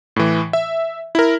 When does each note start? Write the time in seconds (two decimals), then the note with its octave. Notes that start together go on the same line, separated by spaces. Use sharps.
0.16 A2 E3
0.53 E5
1.15 E4 A#4